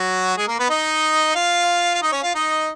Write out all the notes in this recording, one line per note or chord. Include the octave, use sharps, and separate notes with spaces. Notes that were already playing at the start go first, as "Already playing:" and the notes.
Already playing: F#3 F#4
G#3 G#4
A#3 A#4
B3 B4
D#4 D#5
F4 F5
F5
D#4 D#5
C#4 C#5
F4 F5
D#4 D#5